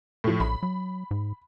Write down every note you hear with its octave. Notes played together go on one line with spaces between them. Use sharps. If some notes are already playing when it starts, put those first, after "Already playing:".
A2 F3
A#1 B5
F#3
G#2